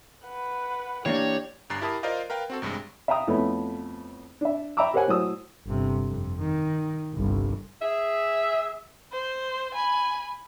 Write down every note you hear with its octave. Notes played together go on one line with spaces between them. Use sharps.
B4 F#5
E3 A#3 D4 G4 C#5 D5
G1 G2 A#5 F#6 A6 C7
E4 G4 A#4 A5 B5 D#6
F4 A#4 C5 D5 D#5 F5
A#4 B4 F5 G5
C4 F#4 A4
A1 G2 C3 G#3
E5 F5 G5 A#5 D#6
F2 A3 B3 C#4 E4
D4 E5
E5 G5 A#5 B5 D6 E6
G4 A#4 C5 C#5 F#5 G#5
A2 F#3 C5 D#6 E6
G1 C3
F2
D#3
G1 C2
G#4 E5
C5
G#5 B5